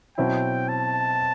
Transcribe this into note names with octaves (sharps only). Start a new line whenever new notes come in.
B2 F#3 C4 E4 G5
A5